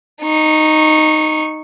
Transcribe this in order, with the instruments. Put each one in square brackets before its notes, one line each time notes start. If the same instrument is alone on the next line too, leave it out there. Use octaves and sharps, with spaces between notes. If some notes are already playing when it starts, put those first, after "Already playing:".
[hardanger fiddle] D#4 C#6